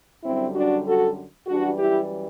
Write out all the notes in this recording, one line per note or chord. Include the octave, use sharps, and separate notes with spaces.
F#2 D3 G3 C4 E4
D4 F#4
F#4 A4
F#2 E3 G3 D4 F#4
E4 G4